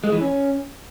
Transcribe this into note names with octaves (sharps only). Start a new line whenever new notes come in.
G#3
E3
C#4